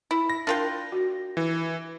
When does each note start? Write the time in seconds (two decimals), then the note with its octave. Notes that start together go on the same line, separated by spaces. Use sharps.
0.11 E4
0.30 A#6
0.47 D4 F4 A#4 G5
0.92 F#4
1.37 E3